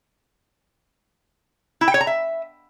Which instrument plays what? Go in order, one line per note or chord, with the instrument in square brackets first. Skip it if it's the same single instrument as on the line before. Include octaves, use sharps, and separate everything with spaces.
[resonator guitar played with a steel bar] E4
G5
C#5
A#5
E5